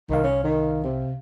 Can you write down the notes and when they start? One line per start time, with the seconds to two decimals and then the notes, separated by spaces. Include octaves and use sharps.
0.10 C2 D#3 F5
0.24 C#4
0.44 D#3
0.84 C3